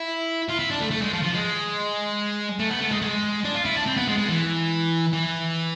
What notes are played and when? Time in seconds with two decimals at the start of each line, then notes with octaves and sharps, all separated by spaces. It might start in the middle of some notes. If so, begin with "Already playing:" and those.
Already playing: E4
0.49 F4
0.59 E4
0.70 D4
0.80 A3
0.91 A3
1.02 G#3
1.12 F3
1.23 F3
1.33 G#3
2.59 A3
2.70 B3
2.81 A3
2.91 G#3
3.02 G#3
3.44 D4
3.55 F4
3.65 E4
3.76 D4
3.86 C4
3.97 B3
4.08 G#3
4.18 G#3
4.28 E3
5.13 E3